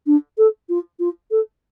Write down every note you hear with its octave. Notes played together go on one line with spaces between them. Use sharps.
D4
A4
F4
F4
A4